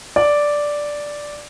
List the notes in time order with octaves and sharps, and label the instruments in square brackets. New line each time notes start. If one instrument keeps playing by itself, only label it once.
[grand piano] D5